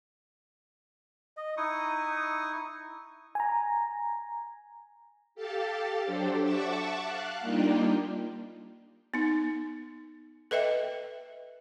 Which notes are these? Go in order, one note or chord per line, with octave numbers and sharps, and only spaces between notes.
D#5
D#4 E4 C#6 D#6
G#5 A#5
G4 A4 F5 A5
F#3 D4 G4 A4 C5
E5 F#5 A5 C#6 D6 E6
F5 F#6
G3 A#3 D4 D#4 F4 G4
B3 D#4
A4 B4 D#5 E5 G5